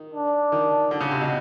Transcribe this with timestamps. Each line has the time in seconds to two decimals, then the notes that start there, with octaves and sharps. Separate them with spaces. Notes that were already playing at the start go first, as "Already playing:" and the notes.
Already playing: D#3
0.13 D4
0.52 D#3
0.91 D3
1.01 C#3
1.11 C3
1.21 B2